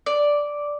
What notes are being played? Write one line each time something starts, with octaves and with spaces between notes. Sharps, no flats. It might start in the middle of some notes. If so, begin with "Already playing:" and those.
D5